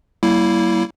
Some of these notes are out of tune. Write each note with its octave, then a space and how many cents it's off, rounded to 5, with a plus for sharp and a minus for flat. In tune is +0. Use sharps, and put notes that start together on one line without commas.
G3 -40 A#3 +0 E4 +0